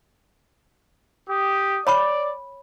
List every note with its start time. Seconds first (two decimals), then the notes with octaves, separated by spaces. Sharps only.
1.30 G4 D#6
1.87 C#5 D5 B5 C#6